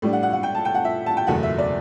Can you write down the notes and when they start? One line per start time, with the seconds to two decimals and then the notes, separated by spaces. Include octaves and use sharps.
0.02 A2 G3 D4
0.13 F#5
0.23 F#5
0.33 F#5
0.43 G5
0.55 A5
0.65 G5
0.75 F#5
0.85 E5
1.06 A5
1.17 G5
1.27 F#1 E2 B2 A3 F#5
1.43 E5
1.58 D5